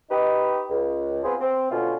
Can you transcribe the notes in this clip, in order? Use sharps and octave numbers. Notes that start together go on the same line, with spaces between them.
D#4 G4 B4
C#2
B3 C4 F4 G#4 B4 C5
C4
B2 D3 C#4 F4